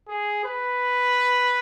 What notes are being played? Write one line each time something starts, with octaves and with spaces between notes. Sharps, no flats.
G#4
B4